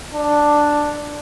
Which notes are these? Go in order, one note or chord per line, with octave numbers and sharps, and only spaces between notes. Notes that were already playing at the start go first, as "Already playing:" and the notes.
D4